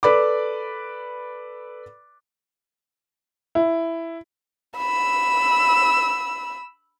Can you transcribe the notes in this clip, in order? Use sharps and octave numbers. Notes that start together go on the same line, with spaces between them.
A4 B4 D5 B5 D6
E4
B5 E6